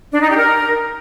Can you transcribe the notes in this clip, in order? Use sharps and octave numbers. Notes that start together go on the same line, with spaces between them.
D4
D#4
G4
A#4